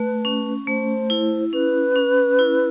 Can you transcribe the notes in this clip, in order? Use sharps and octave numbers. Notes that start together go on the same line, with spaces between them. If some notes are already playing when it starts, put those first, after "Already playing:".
Already playing: A3 B4
C#4
A3 C5
E4
C#4 B4
C#4
E4